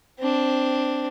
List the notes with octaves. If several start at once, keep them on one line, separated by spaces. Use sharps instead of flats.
C4 D4